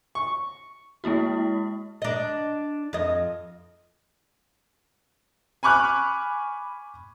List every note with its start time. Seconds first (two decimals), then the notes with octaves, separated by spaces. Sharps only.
0.15 C#6
1.04 G#3 A#3 E4 F#4
2.02 D4 D#5
2.93 F2 D#5
5.63 G#5 B5 C#6 D6 F6 F#6